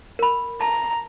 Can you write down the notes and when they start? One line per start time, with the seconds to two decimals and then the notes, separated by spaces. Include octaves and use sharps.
0.19 A#4 B5
0.61 A5 A#5